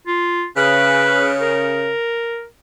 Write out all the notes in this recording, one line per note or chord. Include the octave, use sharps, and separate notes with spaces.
F4
C#3 B4
A#4